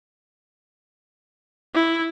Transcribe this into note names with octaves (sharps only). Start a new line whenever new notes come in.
E4